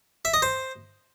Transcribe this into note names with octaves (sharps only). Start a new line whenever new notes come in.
E5
D#5
C5